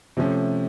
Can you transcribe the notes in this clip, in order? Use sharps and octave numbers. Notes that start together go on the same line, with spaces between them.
C3 F3 A3 C#4